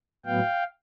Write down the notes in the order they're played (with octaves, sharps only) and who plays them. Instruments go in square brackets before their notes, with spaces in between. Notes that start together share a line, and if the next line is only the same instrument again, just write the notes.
[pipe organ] A2 F#3 B3 F5 G5